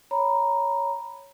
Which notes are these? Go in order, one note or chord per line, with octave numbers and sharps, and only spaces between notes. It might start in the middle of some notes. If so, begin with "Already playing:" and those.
C#5 A#5 B5